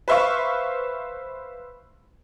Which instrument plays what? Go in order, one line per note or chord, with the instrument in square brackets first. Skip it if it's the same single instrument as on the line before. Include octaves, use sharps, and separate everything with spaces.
[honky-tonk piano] B4 C5 E5 F5 C#6